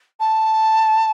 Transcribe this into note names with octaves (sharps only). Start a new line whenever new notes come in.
A5